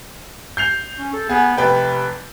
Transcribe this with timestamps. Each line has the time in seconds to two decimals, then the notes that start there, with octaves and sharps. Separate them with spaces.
0.57 G6 C7 F7
0.99 C#4
1.13 A4
1.29 B3 G#4
1.58 F1 C3 B4 G5